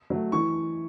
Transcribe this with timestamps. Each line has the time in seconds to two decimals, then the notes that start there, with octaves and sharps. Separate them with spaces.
0.10 F#3 A3
0.32 E3 C#6